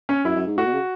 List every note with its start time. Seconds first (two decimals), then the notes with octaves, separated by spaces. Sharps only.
0.09 C#4
0.24 F#2 E4
0.36 F#2
0.47 G#2
0.57 A2 F#4
0.66 B2
0.73 C#3